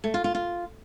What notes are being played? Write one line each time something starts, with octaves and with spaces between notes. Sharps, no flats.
A3
F4
F4
F4